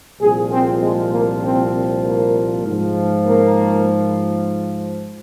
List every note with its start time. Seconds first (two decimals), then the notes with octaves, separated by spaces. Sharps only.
0.20 C2 A#2 F3 G#4
0.50 C4
0.81 G#3
1.11 A#3
1.42 C4
2.03 A#3
2.64 G#2 F3
3.25 A#3